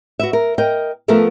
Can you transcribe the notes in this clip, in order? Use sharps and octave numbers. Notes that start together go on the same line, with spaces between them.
F#4 B4 E5
A#4
A#4 D#5 G5
F3 A3 B3 A4 A#4 E5